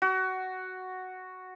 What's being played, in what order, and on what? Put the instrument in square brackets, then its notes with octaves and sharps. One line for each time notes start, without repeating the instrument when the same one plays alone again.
[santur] F#4